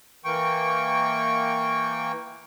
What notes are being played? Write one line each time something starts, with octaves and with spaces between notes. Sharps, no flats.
E3 A#3 G5 C#6